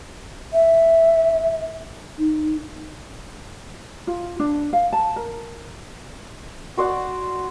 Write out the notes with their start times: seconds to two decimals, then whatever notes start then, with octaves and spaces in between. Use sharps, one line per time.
0.53 E5
2.18 D#4
4.07 F4
4.39 D4
4.73 F5
4.93 A5
5.16 A#4
6.77 F#4 C5 D5 F#5